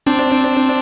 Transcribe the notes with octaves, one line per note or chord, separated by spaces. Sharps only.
C4 D4